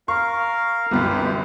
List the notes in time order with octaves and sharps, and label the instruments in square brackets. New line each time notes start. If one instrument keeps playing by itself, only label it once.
[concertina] A#4 F5 [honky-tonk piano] C#6
[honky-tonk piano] G1 C2 F#2 [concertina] G4 B4